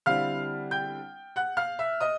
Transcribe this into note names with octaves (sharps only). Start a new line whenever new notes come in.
D3 G3 C4 E4 F5 F6
G5 G6
F#5 F#6
F5 F6
E5 E6
D#5 D#6